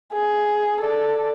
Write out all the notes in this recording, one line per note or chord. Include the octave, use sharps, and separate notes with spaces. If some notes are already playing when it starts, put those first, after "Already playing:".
G#4
A4 D5